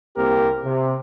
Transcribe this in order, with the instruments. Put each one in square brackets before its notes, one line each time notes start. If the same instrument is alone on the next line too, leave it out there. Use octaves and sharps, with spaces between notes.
[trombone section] C2 A#3 C4 G4 A#4
C3